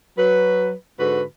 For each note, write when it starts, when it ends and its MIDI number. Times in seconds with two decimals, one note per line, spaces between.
0.18 0.72 54
0.18 0.72 71
0.99 1.22 44
0.99 1.22 50
0.99 1.22 66
0.99 1.22 71